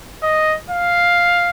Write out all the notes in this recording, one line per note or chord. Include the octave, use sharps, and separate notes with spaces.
D#5
F5